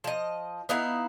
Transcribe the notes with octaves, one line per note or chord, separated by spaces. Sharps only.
F3 D#5
B3 D#4 E4 F5